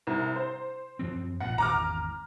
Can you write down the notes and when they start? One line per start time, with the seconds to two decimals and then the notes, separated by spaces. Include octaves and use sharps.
0.07 C2
0.36 C5
0.99 F#2 F3 C4
1.40 A#1 A#2 F#5
1.58 G#1 E2 A#5 D6 F6